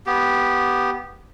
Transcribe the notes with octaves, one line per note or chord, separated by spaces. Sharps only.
B3 G4